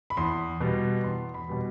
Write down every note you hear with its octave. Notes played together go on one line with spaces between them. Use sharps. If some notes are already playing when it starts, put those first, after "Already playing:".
B5
E2 C6
B2 G3 B3
E2 C6
B5
B2 G3 B3